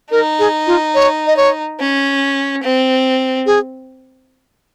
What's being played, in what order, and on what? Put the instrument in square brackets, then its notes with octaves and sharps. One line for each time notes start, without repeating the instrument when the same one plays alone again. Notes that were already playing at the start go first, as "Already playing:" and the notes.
[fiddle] D#4 [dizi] A#4
[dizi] G#4
F4
C#5
D#5
C#5
[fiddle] C#4
C4
[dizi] G#4